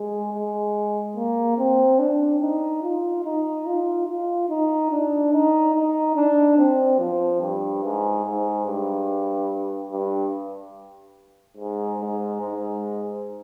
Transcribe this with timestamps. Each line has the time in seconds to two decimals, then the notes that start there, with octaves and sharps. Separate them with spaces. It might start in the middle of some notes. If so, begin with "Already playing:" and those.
Already playing: G#3
0.33 G#3
1.16 A#3
1.58 C4
1.99 D4
2.41 D#4
2.82 F4
3.25 D#4
3.66 F4
4.07 F4
4.49 D#4
4.92 D4
5.33 D#4
5.74 D#4
6.16 D4
6.58 C4
6.99 F3
7.41 G2
7.83 G#2
8.24 G#2
8.66 G2
9.91 G2
11.57 G#2
12.00 G#2
12.41 G#2